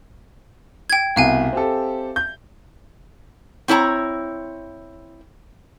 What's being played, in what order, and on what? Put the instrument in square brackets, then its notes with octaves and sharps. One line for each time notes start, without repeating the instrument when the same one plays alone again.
[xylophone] G5 G#6
[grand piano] C2 B2 [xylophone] E5 F5 G#5
[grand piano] C4 G4 A4
G6
[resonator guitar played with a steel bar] C4 E4 C#5 A5 A#5